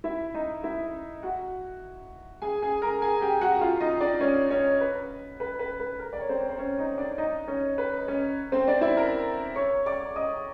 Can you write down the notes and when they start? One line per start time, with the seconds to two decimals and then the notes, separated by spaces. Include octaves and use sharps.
0.04 E4 E5
0.34 D#4 D#5
0.63 E4 E5
1.23 F#4 F#5
2.42 G#4 G#5
2.62 G#4 G#5
2.82 A#4 A#5
3.02 G#4 G#5
3.21 G4 G5
3.41 F#4 F#5
3.61 F4 F5
3.81 D#4 D#5
4.01 D4 D5
4.21 C#4 C#5
4.51 C#4 C#5
4.80 B4
5.40 B4
5.59 B4
5.80 B4
5.99 A#4
6.13 D5
6.21 C#5
6.29 C4 C5
6.49 C5
6.58 C#4 C#5
6.78 D#4 D#5
6.98 D4 D5
7.18 D#4 D#5
7.48 C#4 C#5
7.78 B4
8.08 C#4 C#5
8.52 C4 C5
8.68 D4 D5
8.81 E4 E5
8.97 A#4 A#5
9.56 C#5 C#6
9.86 D5 D6
10.16 D#5 D#6